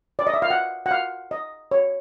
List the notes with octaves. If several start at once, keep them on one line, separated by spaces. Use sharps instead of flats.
D5
D#5
E5
F5
F#5
F#5
F5
D#5
C#5